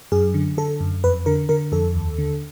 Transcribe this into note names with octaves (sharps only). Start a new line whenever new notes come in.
F#2 G#4
D3
D3 A4
F#2
F2 B4
D3 A#4
D3 A#4
F2 A4
D#2
D3